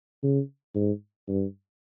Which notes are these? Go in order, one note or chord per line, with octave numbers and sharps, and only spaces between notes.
C#3
G#2
G2